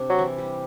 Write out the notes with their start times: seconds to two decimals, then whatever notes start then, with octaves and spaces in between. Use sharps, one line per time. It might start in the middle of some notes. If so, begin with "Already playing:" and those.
Already playing: C3 C4 D4
0.10 F#3
0.19 E3 E4
0.38 G3 G4